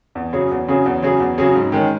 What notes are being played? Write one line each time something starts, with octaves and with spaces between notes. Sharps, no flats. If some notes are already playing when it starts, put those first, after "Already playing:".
E2
C#3 F#3 C#4 G#4
E2
C#3 F#3 C#4 G#4
E2
C#3 F#3 C#4 G#4
E2
C#3 F#3 C#4 G#4
G#2
D#3 G#3 C#4